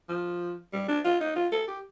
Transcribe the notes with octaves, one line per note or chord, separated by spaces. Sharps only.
F3
G3
D4
F4
D#4
F4
A4
G4